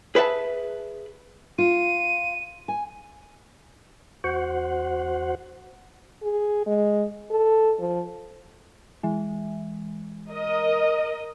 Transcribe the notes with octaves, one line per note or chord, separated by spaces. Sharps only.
G#4 B4 E5 F#5 A5
F4 D#7
G#5
E2 F#4 C5 F#5
G#4
G#3
A4
F3
E3 G#3
A#4 D#5